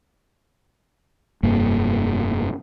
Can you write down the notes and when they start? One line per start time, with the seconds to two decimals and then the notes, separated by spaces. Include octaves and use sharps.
1.43 F1 G2 A#3